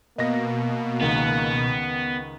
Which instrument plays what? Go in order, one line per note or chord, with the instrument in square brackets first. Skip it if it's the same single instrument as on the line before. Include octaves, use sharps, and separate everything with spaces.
[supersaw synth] B2 [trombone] A#3 [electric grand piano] D#5 A#6
[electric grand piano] C#2 D#3 [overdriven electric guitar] B3